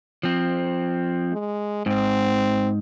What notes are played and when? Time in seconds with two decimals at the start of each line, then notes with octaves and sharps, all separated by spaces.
0.23 F3 C4
1.32 G#3
1.86 G#2 C4